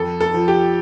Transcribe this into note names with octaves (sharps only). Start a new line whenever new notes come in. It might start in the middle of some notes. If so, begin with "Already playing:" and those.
Already playing: F2 A4
A4
F3
G4